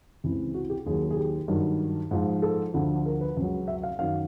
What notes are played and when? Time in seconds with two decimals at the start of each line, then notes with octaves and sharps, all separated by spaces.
0.24 C#2 C3 E3
0.54 F#4
0.70 G4
0.86 D#2 D#3 F#3 G#4
1.11 G#4
1.17 G4
1.48 G2 D#3 F#3
2.11 G#2 F3
2.42 A4
2.74 D2 D3 F3
3.06 A#4
3.21 B4
3.37 C#2 C#3 F#3
3.68 E5
3.83 F5
3.99 F#2 D#3 F#3 F5